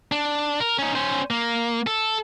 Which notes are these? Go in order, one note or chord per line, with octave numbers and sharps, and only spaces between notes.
D4
A#4
C#4 D#4
C#4 C5
A#3
A4